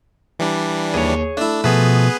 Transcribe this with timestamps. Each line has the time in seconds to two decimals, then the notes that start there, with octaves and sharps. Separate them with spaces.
0.39 E3 G3 D4
0.94 D#2 G#4 C#5
1.37 A3 D4 E4
1.64 B2 F3 A3 B3 G#4 B4